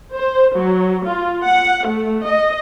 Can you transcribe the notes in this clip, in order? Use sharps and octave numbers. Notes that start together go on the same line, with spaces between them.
C5
F#3
F4
F#5
A3
D#5